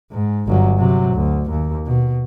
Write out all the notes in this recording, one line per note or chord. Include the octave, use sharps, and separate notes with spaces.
G#2
G1 F#3
C3 F#3
D2
D#2
B2